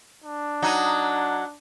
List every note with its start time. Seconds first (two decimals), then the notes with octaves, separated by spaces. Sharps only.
0.24 D4
0.62 F#3 D#4